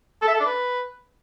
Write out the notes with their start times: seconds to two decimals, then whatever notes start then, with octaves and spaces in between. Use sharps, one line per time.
0.22 A4
0.28 E5
0.34 A4
0.40 D4
0.46 B4